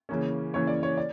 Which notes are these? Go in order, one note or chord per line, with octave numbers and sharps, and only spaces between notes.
C#3 E3 A#3 C#4
C#3 E3 A#3 C#4 C#5
D5
C#5
D5